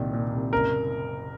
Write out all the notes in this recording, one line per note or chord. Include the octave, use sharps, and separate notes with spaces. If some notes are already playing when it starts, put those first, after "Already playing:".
Already playing: C2 A#2 D#3
A#2
C2
F#1 A#4